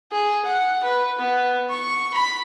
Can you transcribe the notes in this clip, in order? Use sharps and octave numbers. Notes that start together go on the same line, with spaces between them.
G#4
F#5
B4
B3
C#6
B5